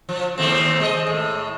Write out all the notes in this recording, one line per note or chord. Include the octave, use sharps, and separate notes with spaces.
F3
D#2 A3 C4
G#3 F#4 D#5
A2